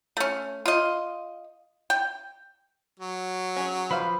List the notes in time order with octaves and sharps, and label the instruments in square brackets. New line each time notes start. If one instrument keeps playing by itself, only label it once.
[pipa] A3 C#4
F4 D#5
G5
[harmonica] F#3
[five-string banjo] C#4 G#4
[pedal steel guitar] F3 B5 [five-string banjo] B4 C5 F5